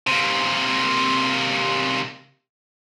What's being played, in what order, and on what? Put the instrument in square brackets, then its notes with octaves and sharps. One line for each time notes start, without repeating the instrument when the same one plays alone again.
[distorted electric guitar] C3 A#3